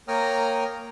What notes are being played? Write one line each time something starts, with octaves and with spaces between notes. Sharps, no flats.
A#3 C#5 G5 A#5 D#6 F6